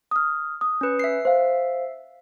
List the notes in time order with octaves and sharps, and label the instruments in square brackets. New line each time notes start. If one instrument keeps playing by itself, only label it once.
[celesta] D#6 F6
D#6
[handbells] C#4 B4
E5 C7
[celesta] C5 F5